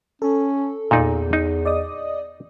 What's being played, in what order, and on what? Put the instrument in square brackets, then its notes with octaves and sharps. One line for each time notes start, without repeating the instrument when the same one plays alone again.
[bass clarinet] C#4 [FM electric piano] A4
[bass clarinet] E2 [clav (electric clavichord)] A#2 D#4 D5
[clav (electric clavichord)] D#4
[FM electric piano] D5 D#5 D#6